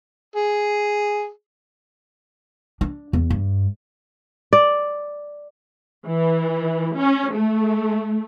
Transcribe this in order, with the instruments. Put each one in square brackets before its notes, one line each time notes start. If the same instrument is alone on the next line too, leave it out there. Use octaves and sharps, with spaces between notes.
[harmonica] G#4
[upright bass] D4
E2
G2
[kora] D5
[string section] E3
C#4
A3